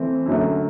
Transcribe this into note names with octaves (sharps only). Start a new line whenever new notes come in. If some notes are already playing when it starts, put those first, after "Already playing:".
Already playing: E3 A3 C4
F#2 D3 F#3 A3